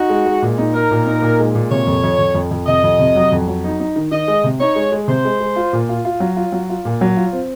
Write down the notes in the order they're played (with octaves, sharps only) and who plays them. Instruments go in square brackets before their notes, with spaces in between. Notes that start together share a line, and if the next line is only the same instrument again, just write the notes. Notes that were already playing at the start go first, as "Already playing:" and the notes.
Already playing: [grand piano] D#4 [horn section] F#4
[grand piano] G#3
G#3
A#2
D#4
[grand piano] D#4 [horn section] A#4
[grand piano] A#2
D#4
A#2
G#3
A#2
[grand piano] C3 [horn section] C#5
[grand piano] F2
F2
F2
F2
F2
[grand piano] C3 [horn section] D#5
[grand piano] F2
C3
F#3
F2
F#3
D#4
D#4
D#3
[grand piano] D#3 [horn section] D#5
[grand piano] G#3
C3
[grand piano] D#4 [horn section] C#5
[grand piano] G#3
G#3
[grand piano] C3 [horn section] C5
[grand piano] G#3
G#3
F4
A#2
F4
F4
F#3
F4
F#3
F4
A#2
F#3
F4
C4